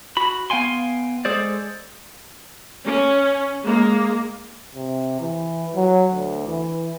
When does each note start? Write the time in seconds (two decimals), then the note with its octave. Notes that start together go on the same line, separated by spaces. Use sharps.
0.17 F#4 B5
0.50 B3 F5 G5 G#5 C6
1.25 G#3 G#4 A4 C5 D5
2.86 C#4
3.62 G#3 A#3
4.75 C3
5.20 E3
5.75 F#3
6.12 D2
6.47 E3